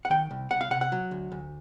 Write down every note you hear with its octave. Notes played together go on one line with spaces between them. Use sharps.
F#5
D#3 G5
C2
C2 F#5
F5
C3 F#5
F#5
F#3
D2
D2